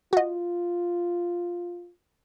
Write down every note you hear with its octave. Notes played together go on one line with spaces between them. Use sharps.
F4 F#4 D#5